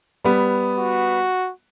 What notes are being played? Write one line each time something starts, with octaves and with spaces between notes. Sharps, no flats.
G3 B3
F#4